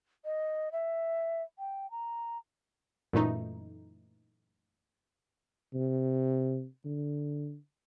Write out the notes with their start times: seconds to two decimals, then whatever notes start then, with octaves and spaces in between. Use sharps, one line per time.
0.25 D#5
0.72 E5
1.59 G5
1.91 A#5
3.13 F#2 A#2 E3 A3 D#4
5.74 C3
6.85 D3